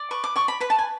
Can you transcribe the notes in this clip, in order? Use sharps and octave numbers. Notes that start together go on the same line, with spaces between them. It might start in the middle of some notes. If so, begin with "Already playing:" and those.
Already playing: D5
B4 C#6
D6
D5 C#6
B5
B4 B5
A5
G#5